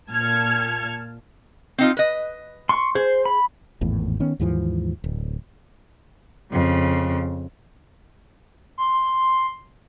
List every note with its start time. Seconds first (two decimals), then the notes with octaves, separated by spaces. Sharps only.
0.11 A#2 A5 F6 G#6 C#7
1.78 C4 D#4 F4
1.97 B4 D#5
2.69 C6 C#6
2.95 G#4 C5
3.25 B5
3.81 G#1 E2 A2
4.20 D#3 B3 C#4
4.40 D#2 G#2 E3 F3
5.04 D1
6.52 F2 C#3
8.78 C6